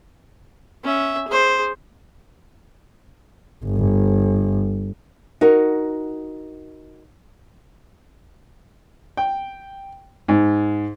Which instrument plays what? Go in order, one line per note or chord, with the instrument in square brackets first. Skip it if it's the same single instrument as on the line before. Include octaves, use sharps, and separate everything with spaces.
[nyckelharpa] C#4 E5
G#4 C5
[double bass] G1
[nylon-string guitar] D#4 F#4 A#4
[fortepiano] G5
G#2